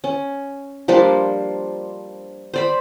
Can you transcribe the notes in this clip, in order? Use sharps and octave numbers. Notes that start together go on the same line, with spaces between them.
C#4
F3 G3 A#3 D4
C5 D5 B5